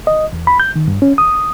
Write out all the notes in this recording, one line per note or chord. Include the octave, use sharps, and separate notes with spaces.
D#5
E2
B5
G6
D#3
G2
C#4
D#6